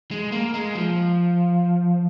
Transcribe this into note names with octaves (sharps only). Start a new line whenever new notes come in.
G#3
A#3
G#3
F3